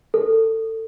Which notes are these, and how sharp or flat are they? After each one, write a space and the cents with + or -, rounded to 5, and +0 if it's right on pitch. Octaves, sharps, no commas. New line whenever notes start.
A4 +25